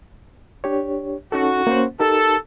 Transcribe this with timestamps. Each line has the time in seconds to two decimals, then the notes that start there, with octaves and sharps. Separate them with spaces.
0.64 D4 G4 C#5
1.32 C#4 D#4 F#4 A4
1.67 A#3 C#4 C5
2.00 D#4 G4 A4 A#4